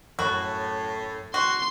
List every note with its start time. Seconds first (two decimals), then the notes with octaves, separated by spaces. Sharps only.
0.19 F#2 A2 F#4
1.34 F#4 C6